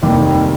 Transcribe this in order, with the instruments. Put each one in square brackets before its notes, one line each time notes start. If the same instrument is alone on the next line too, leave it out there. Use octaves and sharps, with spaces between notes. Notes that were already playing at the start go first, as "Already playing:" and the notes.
[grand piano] F1 D#2 D#3 G3 A#3